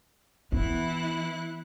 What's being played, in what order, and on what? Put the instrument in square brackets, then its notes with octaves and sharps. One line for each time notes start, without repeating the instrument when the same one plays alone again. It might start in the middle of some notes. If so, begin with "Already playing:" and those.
[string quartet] E3 E4 F#6 [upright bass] B3